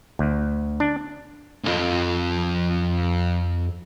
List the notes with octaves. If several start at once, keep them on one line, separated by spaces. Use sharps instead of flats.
D2
D4
C2 F2